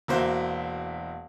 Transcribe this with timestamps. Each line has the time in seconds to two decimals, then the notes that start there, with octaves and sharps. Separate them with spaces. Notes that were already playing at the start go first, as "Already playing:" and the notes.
0.08 E1 A#3 F#4 C5 E5